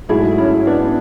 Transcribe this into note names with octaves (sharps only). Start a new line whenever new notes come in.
G#2 F#3 A3 E4 G#4
C#4 E4
B3 D4